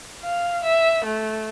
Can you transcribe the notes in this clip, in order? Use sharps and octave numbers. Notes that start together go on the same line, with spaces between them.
F5
E5
A3